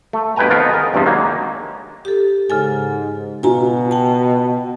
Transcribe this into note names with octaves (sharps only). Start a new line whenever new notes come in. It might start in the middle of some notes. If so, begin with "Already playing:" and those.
A3
G2 B2 B4 G5 G#5 A#5
F2 D#3 B3 F4 A#4 D#5
G#4 A#4
E2 G2 C3 F3
D#3 F#3 G#3 A#3
G4 A4
G#2 C#3 A4 G#5
B2 F4 F#4 G#5 A#5
G5 A5